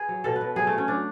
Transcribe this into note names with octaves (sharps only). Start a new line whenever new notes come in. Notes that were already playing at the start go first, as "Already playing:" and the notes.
Already playing: G#4 B4
F#3
B2 A4
B4
B2
F#3 G#4
A3
F#3
C#4
F#3 D4